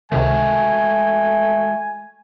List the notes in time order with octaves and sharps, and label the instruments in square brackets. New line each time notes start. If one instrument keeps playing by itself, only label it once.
[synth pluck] C#2 C3 D#3 [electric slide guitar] G#3 F#4 A5 [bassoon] A3 [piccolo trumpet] G#5